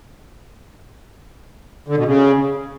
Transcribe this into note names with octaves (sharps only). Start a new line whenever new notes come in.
D3
B2
C#3